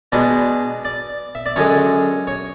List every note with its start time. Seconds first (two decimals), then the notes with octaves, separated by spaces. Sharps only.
0.12 B2 G#3 D4 D5
0.85 D5
1.35 E5
1.46 D5
1.56 F#2 D3 G#3 C#5
2.27 C#5